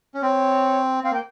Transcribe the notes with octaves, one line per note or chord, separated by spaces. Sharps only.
C#4
C4 C#5
C4 F5
A#3 G5